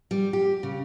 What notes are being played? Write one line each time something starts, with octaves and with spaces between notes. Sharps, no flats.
G3
G4
C#3